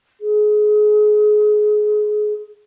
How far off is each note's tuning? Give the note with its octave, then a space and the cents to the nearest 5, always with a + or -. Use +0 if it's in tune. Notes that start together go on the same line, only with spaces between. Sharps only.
G#4 +25